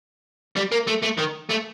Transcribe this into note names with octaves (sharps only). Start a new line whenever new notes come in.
G3
A#3
A3
A3
D#3
A3